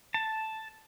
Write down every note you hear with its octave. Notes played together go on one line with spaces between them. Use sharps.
A5